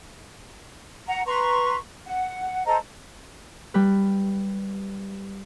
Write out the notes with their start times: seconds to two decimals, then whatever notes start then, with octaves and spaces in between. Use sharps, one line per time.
1.08 F#5 A#5
1.26 B4 A#5 C6 C#6
2.06 F#5
2.66 A4 C5 D#5 A#5
3.74 G3 B4